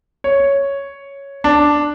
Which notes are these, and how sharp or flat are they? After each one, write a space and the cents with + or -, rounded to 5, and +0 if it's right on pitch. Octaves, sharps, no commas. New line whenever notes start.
C#5 +0
D4 +0